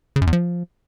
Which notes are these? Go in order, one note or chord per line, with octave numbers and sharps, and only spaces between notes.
C#3
F#2
E2
F3